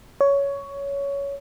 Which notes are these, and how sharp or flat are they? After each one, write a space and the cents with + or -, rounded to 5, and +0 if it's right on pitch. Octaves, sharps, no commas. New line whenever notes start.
C#5 +15